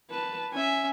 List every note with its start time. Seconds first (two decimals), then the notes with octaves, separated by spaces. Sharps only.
0.10 B4 A5
0.53 C#4 E5 G#5